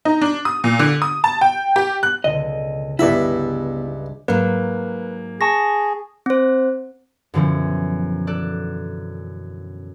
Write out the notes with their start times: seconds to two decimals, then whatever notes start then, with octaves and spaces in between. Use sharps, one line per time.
0.05 D#4
0.21 D4
0.45 D#6
0.64 A#2
0.79 D3
1.02 D#6
1.24 A5
1.41 G5
1.76 G4
2.03 F#6
2.24 C#2 B2 D3 D#5
2.99 C#2 G2 B3 E4 E5
4.28 G#2 F#3 A#3 B4
5.41 G#4 A5 C#6 A#6
6.26 C4 C5
7.34 F#2 B2 D3 E3 F3 C#4
8.27 A4 D5 F#6